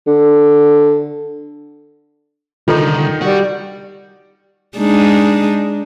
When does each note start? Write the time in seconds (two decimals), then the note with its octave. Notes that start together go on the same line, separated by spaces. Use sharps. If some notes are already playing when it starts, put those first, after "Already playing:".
0.07 D3
2.68 C2 D3 D#3 D#4 F4 A4
3.22 G3 F#4
4.78 G#3 D4 D#4